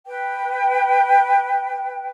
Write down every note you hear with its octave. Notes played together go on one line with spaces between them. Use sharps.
B4 G5